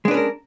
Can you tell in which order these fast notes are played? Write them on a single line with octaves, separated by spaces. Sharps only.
G#3 D4 B4 C#4 A#4